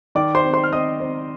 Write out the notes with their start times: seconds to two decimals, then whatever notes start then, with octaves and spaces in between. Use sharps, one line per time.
0.15 D#3 D5 D6
0.35 C5 C6
0.44 C4
0.53 C5 C6
0.64 F6
0.72 C4 D#5 D#6
1.00 C4